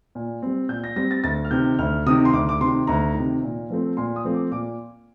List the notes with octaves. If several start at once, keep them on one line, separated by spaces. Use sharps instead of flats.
A#2
G3 C4
A#2 G6
A#6
G3 C4 A#6
A6
D2 A6
F6
C3 D#3 G6
D2 F6
C3 D#3 D#6
C6
D2 D6
D6
C3 D#3 C6
D2 A#5
C3 D#3
A#2
F3 A3 C4
A#2 C6
D#6
F3 A3 C4
D6
A#2 D6